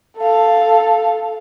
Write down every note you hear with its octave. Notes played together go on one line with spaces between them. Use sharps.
A4 F5